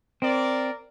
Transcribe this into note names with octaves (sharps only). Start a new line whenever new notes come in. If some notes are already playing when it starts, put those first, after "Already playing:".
C4 A#4 D5